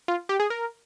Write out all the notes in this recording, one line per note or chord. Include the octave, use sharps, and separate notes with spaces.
F4
G4
G#4
A#4